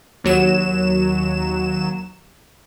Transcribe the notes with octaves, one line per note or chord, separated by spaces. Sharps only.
D#2 F#3 E7